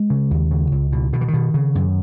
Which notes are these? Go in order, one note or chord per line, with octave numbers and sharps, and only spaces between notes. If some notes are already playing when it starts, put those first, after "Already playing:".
Already playing: G#3
C#3
D#2
C#3
C#2
B2
B2 D#3
E3
D#3
B2
C#3
F#2